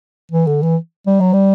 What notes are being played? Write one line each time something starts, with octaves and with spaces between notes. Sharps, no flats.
E3
D3
E3
G3
F#3
G3